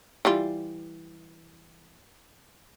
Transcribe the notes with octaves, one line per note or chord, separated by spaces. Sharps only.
E3 G3 F4